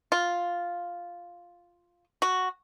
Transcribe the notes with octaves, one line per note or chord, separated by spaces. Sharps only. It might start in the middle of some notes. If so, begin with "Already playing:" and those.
F4
F#4